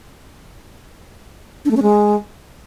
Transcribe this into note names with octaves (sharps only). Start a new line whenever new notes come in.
D4
A3
C#4
G#3